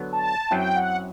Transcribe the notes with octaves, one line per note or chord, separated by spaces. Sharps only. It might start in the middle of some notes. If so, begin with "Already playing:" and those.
Already playing: D3 F#3 B3 D4
A5
F#2 F#3 C4 E4 G5
F#5